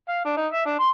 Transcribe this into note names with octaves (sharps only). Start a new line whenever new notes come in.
F5
D4
D#4
E5
D4
C6